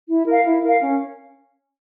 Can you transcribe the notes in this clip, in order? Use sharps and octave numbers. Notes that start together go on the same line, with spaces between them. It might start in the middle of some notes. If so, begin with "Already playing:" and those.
E4
A#4 F5
E4
A#4 F5
C#4